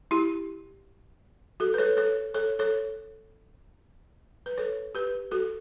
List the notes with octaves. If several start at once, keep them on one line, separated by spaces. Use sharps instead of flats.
E4 G4
F#4 A4
B4
A4 C#5
A4 C#5
A4 C#5
A4 C#5
B4
A4 C#5
G4 B4
F#4 A4